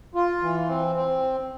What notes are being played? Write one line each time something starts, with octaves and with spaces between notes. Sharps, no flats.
F4
E3
C4
C4